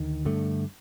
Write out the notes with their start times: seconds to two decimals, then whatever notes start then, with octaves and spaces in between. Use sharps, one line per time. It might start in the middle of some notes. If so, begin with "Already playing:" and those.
Already playing: D2 D#3
0.25 G2 D3 A3